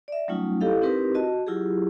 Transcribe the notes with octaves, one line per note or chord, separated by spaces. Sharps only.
D5 E5
F#3 G3 A3 C#4 D#4 F4
E4 G4 A4 D#5 F5
C4 D#4 E4 G4 A#4 B4
F#4 D#5 A5
F#3 E4 F4 G4 G#4